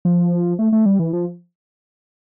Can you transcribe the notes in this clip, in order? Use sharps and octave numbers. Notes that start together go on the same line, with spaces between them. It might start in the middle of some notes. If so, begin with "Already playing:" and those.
F3
A3
A3
G3
E3
F3